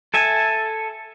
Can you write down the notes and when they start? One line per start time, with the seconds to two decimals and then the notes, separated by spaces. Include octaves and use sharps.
0.14 A4 E5 G#5